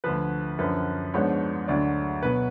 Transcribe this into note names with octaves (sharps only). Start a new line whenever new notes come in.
D2 D3 F3 B4
F#2 D3 F3 B4
G#2 F3 B3 D4 C#5
D2 D3 F#3 D5
B2 F#3 B3 B4